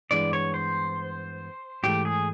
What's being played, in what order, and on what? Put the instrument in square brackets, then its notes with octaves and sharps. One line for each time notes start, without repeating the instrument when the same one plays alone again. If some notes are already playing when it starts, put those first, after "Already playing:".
[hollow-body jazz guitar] G2 E3 G#3 B3 D4 [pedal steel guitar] D5
[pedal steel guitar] C#5
C5
[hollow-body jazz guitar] G#2 E3 A3 [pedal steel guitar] G4
[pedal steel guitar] G#4